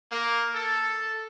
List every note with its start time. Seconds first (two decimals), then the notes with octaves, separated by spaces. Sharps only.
0.11 A#3
0.54 A4